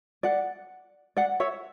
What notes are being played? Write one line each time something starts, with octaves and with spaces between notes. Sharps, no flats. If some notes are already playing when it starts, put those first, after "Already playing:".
D5 F#5
D5 F#5
C#5 E5